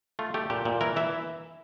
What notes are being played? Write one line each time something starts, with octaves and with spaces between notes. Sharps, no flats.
A3 F4
A3 G4
A#2 G4
A#2
E3 A#4
E3 E5